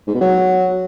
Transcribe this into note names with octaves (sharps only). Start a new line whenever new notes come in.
G#2
B2
F#3